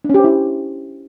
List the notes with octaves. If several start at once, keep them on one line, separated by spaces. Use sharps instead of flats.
C#4 D4 E4 G4 C5